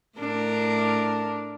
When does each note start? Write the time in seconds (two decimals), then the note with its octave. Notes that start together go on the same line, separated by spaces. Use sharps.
0.18 A2 D4 A#4